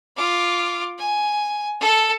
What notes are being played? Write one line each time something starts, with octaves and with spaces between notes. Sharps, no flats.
F4 D6
G#5
A4 A5